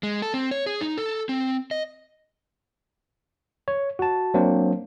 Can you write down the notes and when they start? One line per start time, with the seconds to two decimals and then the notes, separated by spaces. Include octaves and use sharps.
0.03 G#3
0.22 A4
0.34 C4
0.51 C#5
0.66 G#4
0.81 D#4
0.98 A4
1.29 C4
1.71 D#5
3.68 C#5
3.99 F#4 A5
4.34 F#3 A#3 C4 D4 C5